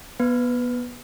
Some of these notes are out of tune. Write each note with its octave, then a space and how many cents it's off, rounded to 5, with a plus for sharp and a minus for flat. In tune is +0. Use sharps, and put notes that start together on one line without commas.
B3 -20 B4 +15